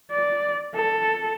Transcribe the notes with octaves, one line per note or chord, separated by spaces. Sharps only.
D5
A4